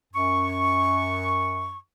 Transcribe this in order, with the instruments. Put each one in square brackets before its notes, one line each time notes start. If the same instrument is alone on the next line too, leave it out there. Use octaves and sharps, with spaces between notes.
[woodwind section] F#2 C#6